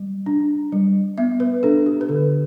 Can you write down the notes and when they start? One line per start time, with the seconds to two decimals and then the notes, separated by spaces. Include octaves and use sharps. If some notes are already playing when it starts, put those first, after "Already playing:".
Already playing: G3
0.26 D4
0.72 G3
1.18 B3 E5
1.40 B4
1.63 D4 A4
1.86 G4
2.01 B4
2.09 D3 A4